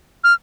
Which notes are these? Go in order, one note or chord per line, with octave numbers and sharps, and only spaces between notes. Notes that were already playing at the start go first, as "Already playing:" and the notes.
F6